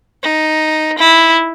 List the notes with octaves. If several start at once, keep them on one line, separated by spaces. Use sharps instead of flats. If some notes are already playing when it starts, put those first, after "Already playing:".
D#4
E4